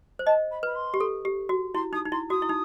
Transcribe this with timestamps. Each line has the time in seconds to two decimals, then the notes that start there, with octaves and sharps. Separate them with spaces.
0.19 C5
0.26 D#5 A5
0.51 B5
0.63 B4 B5
0.75 C6
0.94 G4
1.00 A4
1.25 G4
1.49 F#4
1.74 E4 C6
1.93 D#4 D#6
2.05 D#4
2.12 E4 C6
2.30 F#4 D#6
2.42 E4
2.49 D#4